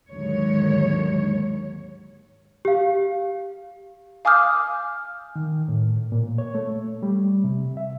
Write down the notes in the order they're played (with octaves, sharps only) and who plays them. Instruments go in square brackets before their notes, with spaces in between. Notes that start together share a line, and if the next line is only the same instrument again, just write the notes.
[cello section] D#2 G#2 D3 F#3 G#3 C#5
[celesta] G4 F5
[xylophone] F5 G#5 D6 D#6 F6 G6
[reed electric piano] D#3
A2
A#2
C#5
A3
G3
C3
E5